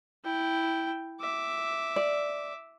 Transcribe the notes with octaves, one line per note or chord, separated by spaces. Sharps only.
E4 G5
E5 D6
D5